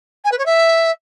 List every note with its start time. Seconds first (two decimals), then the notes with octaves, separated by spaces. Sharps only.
0.24 G#5
0.31 B4
0.38 C#5
0.45 E5